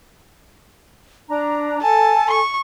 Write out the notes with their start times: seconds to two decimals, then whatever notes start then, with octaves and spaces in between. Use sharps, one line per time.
1.28 D4 A#5
1.82 A4 G#5 A5
2.31 C#6